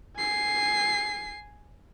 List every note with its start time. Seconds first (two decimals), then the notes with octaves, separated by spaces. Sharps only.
0.17 G#5 C7